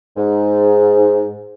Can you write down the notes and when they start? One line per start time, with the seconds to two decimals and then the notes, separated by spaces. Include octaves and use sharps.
0.17 G#2